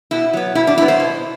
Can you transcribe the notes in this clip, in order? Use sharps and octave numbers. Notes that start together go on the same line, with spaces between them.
B2 E4
F#3 B3
B2 E4
D4
F#3 B3 E4
C5
B2